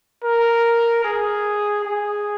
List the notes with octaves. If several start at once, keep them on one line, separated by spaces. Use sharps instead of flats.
A#4
G#4
G#4